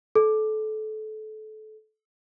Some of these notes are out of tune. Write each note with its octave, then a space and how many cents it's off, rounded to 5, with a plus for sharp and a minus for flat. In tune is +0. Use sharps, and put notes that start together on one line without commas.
A4 -25